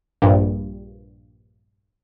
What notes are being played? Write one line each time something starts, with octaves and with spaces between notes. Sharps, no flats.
A#1 G2